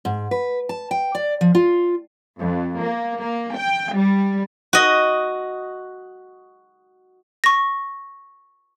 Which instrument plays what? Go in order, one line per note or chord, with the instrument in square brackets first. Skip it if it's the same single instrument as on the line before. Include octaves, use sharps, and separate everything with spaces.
[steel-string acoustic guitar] G#2
B4
A5
G5
D5
F3
F4
[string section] F2
A#3
A#3
G5
G3
[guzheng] F#4 D#5
[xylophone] C#6 A#6